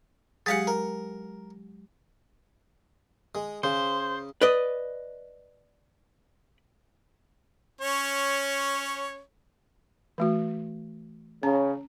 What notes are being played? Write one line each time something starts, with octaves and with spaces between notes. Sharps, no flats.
F#3 G#3 G4 G#4 F5 F#5
A#4
G#3
C#3 C5
B4 D5 D#5
C#4 C#5
E3 A3 F#4
C#3 C#4 A#5